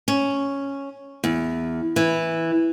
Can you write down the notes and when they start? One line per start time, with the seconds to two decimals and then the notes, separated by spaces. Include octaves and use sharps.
0.08 C#4
1.24 E2
1.96 E3